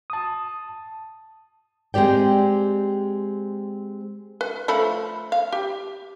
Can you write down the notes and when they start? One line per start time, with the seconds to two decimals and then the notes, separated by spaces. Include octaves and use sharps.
0.10 A5 D#6
1.94 G#3 C4 G4 D5 G5
4.41 B4
4.68 F3 A3 B5
5.32 F5
5.52 G4